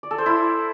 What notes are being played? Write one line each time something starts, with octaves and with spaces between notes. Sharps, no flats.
D5
A4
C5
E4